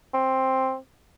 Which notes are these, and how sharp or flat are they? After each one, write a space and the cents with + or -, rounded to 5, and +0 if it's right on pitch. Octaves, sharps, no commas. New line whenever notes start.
C4 +10